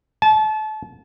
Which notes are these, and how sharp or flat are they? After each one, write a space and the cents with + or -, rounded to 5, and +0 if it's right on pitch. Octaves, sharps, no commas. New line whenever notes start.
A5 -30